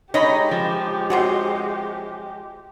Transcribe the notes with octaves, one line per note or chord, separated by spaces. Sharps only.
G#3 A3 D#4 G4 C#5 D#5 B5
F3
C3 D#3 F#3 F#4 F#5 C6